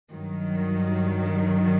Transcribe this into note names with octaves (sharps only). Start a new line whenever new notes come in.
G2 D#3 F#3